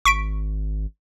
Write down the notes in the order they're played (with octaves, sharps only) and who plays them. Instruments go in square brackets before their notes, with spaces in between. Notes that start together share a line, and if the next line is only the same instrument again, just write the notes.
[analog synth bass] G#1 [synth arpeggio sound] C#6 B6 D7